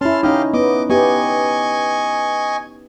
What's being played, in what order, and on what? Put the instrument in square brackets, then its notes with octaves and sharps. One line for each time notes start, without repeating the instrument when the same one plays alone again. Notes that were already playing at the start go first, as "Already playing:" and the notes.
[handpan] C#4 E4 [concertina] A5 C6 F6
[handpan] C#4 D#4 [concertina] G4 D#5 F5
[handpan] B3 [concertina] D#5 D6
[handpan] B3 G4 [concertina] D#5 G#5 C#6